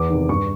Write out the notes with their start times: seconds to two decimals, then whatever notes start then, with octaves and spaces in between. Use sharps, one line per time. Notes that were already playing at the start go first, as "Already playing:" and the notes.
Already playing: E2 D6
0.10 C3 D#3
0.29 G2 C#6